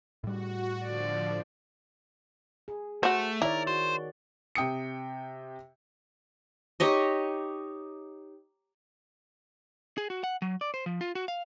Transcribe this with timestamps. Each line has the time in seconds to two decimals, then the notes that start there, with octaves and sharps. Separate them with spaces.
0.24 A2 G3 F#4
0.85 D3 F3 D5
2.68 G#4
3.03 A3 F#4 C5
3.42 D#3 E4 A#4 C#5 D5
3.67 F#4 C5
4.55 C3 G5 D#6 C#7
6.80 D#4 G4 C#5 D#5
9.98 G#4
10.10 F#4
10.24 F#5
10.42 F#3
10.61 D5
10.74 C5
10.86 F3
11.01 F4
11.15 F#4
11.28 F5